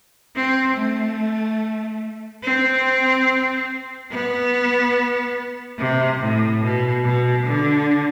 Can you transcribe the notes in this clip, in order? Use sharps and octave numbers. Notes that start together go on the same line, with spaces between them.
C4
A3
C4
B3
C3
A2
B2
B2
D3